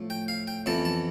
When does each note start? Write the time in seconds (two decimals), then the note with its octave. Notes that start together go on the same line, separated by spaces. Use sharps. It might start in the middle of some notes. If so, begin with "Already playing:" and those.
Already playing: A2 F3 A3
0.10 G5
0.28 F5
0.47 G5
0.66 F2 E3 B3 A5
0.85 A5